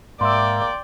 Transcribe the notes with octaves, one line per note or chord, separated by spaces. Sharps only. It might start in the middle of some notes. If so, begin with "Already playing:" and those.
G#2 A#3 D5 E5 G5 C6 E6